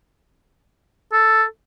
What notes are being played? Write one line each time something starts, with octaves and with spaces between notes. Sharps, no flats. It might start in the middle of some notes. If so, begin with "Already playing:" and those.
A4